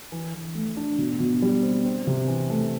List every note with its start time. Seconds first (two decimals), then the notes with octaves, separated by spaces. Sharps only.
0.12 E3
0.34 E3
0.55 A3
0.77 D4
0.98 B2
1.20 B2
1.42 G3
1.63 C4
1.85 C4
2.07 C3
2.27 E3
2.50 A3